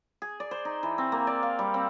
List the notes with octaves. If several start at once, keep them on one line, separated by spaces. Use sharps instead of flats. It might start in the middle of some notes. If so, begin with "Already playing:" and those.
G#4
D5
C5
D#4
E3
C4
A#3
D5
F5
G3
C4